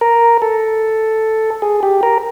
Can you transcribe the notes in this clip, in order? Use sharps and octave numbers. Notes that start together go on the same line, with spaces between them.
A#4
A4
G#4
G4
A#4